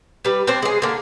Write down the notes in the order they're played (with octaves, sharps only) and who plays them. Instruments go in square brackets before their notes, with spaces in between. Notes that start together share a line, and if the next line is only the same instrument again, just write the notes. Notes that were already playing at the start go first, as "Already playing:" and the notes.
[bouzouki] G3 B4
C4 D4 C5
G#3 G#4
D3 A#3